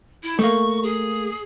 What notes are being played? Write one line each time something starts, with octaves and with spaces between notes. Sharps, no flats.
E4
A3 A#3 C#6
G#4